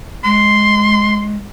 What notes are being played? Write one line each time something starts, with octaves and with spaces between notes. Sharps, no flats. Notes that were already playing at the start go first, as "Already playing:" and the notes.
G#3 C6